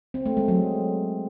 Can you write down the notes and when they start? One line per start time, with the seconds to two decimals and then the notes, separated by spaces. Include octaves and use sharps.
0.14 C4
0.26 A3
0.37 G#3
0.48 F#3